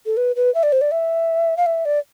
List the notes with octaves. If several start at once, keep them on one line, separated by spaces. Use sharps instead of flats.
A4
B4
B4
E5
D5
C5
D5
E5
F5
E5
D5